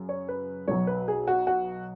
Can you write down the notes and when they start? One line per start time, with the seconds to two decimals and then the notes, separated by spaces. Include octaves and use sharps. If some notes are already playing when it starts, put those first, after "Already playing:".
Already playing: F#2 C#3
0.09 C#5
0.28 B4
0.68 B1 B2 F#3 C#5
0.87 B4
1.08 G#4
1.27 F#4
1.47 F#4